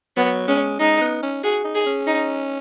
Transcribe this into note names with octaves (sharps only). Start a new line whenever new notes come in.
F#3 B3
G#3 C#4
G#3 D#4
B3
C#4
F#4 G#4
D#4
G#4
C#4
D#4